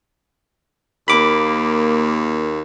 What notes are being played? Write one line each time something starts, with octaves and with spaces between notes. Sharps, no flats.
D#2 A#3 B5 D6